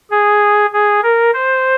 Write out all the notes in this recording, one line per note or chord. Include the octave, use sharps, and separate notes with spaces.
G#4
G#4
A#4
C5